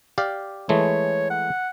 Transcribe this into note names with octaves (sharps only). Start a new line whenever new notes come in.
G4 D5 F5
E3 G#3 A3 C#5
F#5